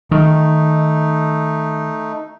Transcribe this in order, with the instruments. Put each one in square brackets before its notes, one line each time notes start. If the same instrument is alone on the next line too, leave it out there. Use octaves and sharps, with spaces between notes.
[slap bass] D#3 [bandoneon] A3 D#4